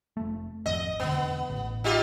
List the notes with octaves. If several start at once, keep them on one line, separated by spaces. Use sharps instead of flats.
F1 A3
G#1 F2 D#5
E1 E2 D3 B3
A1
D#4 F4 G4